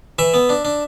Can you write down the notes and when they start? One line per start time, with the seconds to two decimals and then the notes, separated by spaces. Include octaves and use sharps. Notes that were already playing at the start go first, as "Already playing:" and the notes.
0.19 E3 E5
0.34 B3
0.49 D4
0.65 D4